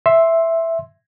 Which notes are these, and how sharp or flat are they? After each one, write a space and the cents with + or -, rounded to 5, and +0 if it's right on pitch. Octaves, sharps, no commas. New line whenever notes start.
E5 +0 C6 +10